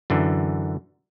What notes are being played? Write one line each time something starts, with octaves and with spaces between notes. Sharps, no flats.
F#2 D3 E3